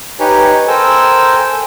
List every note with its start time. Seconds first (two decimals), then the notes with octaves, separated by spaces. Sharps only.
0.20 D#4 G4 B4 C#5 G#5
0.68 A4 A#4 C5 G5 G#5 E6